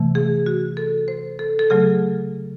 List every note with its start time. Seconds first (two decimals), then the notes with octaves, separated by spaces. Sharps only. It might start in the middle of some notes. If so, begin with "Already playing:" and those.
Already playing: C3 E3 A3
0.15 G#4
0.46 F#4
0.77 A4
1.08 C5
1.39 A4
1.59 A4
1.70 C#3 F#3 A3 G#4